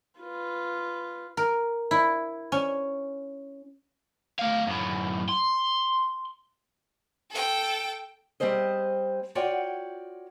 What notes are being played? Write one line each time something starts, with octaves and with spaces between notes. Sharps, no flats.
F4 B4
A#4
E4
C#4
A3 F5
F#2 A2
C6
A4 G5
G3 C4 G#4 C5 D#5
F4 F#4 C#5 D5 F#5 G5